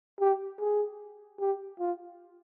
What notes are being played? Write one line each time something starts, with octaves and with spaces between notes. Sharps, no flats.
G4
G#4
G4
F4